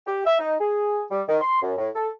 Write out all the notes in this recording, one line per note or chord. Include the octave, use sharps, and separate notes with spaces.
G4
E5
D#4
G#4
G3
D#3
C6
F#2
A2
A4